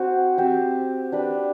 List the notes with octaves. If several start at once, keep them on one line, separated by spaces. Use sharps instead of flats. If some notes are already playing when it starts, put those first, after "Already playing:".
Already playing: C4 F#4 C5
C4 G4 C5 E5
D4 G4 B4